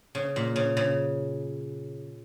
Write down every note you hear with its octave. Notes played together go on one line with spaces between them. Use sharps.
C#3
A#2
C#3
C#3